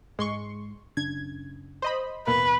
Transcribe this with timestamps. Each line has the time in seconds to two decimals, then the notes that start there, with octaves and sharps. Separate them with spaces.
0.19 G#2 G#3 C6 C#6
0.97 F#1 C#3 D4 G#6
1.82 C5 D#5 B5
2.27 A1 D#2 B2 A#3 B4